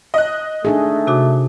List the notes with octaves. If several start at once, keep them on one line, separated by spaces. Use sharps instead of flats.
D#5 F#6
A3 D4 D#4 G#4
C3 F#4 D6